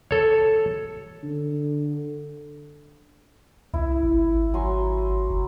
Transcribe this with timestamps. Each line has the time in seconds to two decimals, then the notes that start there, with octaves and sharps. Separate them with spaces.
0.11 A4 C#5
1.23 D3
3.74 C2 E4
4.03 G#1
4.54 F#3 G#5 C6
5.30 F#1